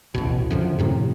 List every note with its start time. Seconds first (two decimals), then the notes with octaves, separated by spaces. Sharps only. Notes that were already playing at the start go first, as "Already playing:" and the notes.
0.14 A1 D2 B2
0.50 F#2 D3 F3
0.79 F#2 A2 C3